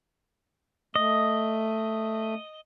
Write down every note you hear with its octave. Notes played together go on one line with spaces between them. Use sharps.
A3 D#5